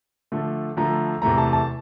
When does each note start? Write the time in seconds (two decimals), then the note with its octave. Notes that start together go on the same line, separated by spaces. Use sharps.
0.32 D3 F3 A3
0.77 D3 F3 A3 A#5
1.22 E2 C3 E3 A3 A#5
1.38 A5
1.53 A5